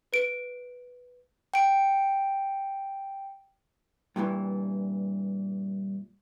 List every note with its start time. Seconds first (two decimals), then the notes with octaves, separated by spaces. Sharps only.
0.13 B4 D7
1.54 G5 D7
4.16 G2 A#2 D3 E3